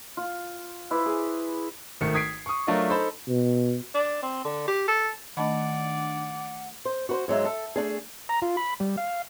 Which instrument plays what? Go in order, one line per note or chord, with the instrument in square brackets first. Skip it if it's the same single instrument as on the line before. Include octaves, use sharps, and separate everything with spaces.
[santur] F4
E4 B4 C5 D5
G#4
[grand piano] G#1 D#3 A3 C#7
D#6 G#6 B6 C7 D7
C#6 D#6
F#3 A3 D4 F4 A#4 D#5
D#4 A4 C5 B5
[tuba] B2
[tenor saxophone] D4
C4
D3
G4
A4
[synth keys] D#3 D4 [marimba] A3 D#5 B5 [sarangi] D5 [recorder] F#5
[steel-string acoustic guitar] C5
F#4 B4 C5
G#2 F#3 G#3 E5
A4
A3 D4 G#4
[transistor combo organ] A#5
F4
B5
G3
F5